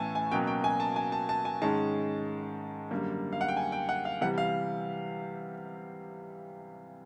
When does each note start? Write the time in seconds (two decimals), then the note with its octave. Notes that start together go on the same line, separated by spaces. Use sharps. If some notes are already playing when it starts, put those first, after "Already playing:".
Already playing: A2 E3 A3 C#4 G#5 A5
0.15 G#5
0.32 B2 F#3 A#3 C#4 G5
0.47 G5
0.64 G#5
0.80 A5
0.96 G#5
1.12 A5
1.29 A5
1.45 G#5
1.61 G#2 D#3 G#3 C#4 A5
2.91 F#2 D3 G3 A#3
3.33 F5
3.41 F#5
3.48 G5
3.57 G#5
3.72 G5
3.89 F#5
4.05 F5
4.21 C3 E3 G3 F#5
4.38 F5